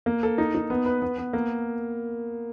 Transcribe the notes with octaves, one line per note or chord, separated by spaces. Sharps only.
A#3
A4
D#4
D#4
B3
B4
B3
B3
A#3